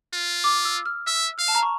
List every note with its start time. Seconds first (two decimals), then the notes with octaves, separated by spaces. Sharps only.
0.13 F4
0.44 D6
0.65 E6
0.86 F6
1.07 E5 E6
1.38 F5 F6
1.48 A5
1.55 A#5
1.63 C#6